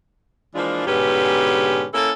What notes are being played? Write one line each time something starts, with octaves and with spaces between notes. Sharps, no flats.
E3 F3 G#3 A#3 D4 F4
G#2 B2 D3 C#4 G4 B4
A#3 C#4 E4 A4